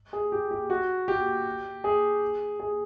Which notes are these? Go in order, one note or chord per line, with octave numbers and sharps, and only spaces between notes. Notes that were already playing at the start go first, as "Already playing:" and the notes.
G#4
G4
G4
F#4
G4
G#4
G#4